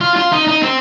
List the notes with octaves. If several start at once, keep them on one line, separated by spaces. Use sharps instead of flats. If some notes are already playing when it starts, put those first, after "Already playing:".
F4
F4
D#4
D#4
C4